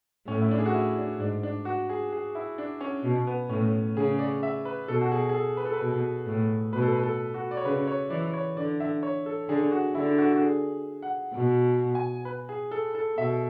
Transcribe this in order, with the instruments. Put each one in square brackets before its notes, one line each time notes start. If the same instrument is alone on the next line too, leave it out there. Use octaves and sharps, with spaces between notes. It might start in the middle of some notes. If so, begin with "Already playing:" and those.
[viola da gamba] A2 [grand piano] C#4
[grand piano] E4
D4
G#4
F#4
E4
D4
[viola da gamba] G#2 [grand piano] D4
[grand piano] D4
F#4
G#4
G#4
E4
D4
C#4
[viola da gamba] B2
[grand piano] B3
[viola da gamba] A2 [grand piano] C#4
[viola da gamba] C#3 [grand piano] G#4
[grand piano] D5
E5
B4
[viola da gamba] B2 [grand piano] A4
[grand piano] F#4
G#4
G#4
A4
B4
A4
B4
[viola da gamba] B2
A2
[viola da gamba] B2 [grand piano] B4
[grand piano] A4
B4
A4
F#4
D5
C#5
[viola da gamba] C#3 [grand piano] B4
[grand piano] C#5
[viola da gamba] E3 [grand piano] D5
[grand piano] C#5
[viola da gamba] D3 [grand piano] D5
[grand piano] E5
C#5
A4
[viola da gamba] D3 [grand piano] G#4
[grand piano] F#4
[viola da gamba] D3 [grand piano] E4
[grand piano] F#4
F#4
G#4
F#5
[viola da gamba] B2
[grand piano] G#5
B4
G#4
A4
A4
[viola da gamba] B2 [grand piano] E5